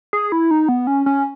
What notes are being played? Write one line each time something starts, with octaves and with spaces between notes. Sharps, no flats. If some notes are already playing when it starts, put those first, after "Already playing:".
G#4
E4
D#4
B3
C#4
C#4